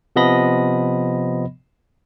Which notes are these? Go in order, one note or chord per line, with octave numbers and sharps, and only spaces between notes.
C3 F3 B3 D#5 B5 A#6